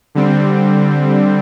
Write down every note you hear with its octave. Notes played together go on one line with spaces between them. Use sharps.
D3 G3 C4